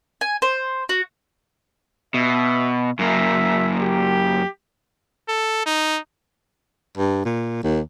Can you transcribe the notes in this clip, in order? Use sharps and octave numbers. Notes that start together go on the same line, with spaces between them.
G#5
C5
F#4
B2 E5
F#2 A#3 E5
G4
A4
D#4
G2
A#2
D#2